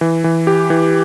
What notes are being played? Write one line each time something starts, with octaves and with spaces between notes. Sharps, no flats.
E3
E3
G4
E3